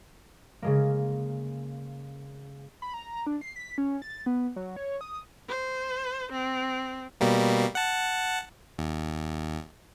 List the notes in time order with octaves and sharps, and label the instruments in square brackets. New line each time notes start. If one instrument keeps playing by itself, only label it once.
[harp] C#3 G#3 A#3
[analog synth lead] B5
A#5
A#5
D4
C7
B6
C#4
A6
B3
F#3
C#5
D#6
[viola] C5
C4
[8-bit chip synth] B2 G3 A#3
F#5 A5
D#2